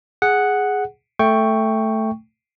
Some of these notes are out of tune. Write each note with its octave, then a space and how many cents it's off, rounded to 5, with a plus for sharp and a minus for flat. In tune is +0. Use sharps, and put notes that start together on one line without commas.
G#4 +0 F#5 +0
A3 +0 G5 +5 C#6 +0